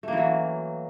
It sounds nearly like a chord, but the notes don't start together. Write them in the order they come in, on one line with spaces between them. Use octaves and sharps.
A3 A#3 E3 F#3